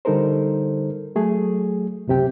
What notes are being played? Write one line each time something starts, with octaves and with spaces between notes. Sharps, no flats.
D3 G3 D#4 A4 A#4 C5
F#3 A3 G#4
C#2 F#2 C3 G4 G5